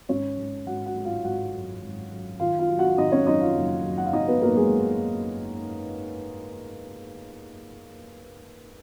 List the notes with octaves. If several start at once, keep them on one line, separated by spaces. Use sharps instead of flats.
G#1 C#4 C#5
G#1
G#1 F#4 F#5
F#4 F#5
G#3
F4 F5
G#1 F#4 F#5
F#2
G#1
F#2
D#3 F4 F5
F4 F5
F#3
F#4 F#5
D#3 D#4 D#5
C#4 C#5
F#1 D#4 D#5
F4 F5
F#1
F#2
F#5
F5
F#1 D#4 D#5
B3 B4
F#2 A#3 A#4
G#3 G#4